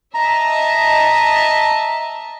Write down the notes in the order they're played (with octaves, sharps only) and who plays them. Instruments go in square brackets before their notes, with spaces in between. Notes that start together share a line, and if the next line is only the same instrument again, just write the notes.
[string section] D#5 E5 A5 [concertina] A#5